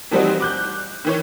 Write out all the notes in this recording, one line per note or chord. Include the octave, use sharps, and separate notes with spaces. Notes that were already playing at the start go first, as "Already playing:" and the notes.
E3 F3 G3 C4 D#4 F#4
D6 F#6 G6
D#3 E3 C#5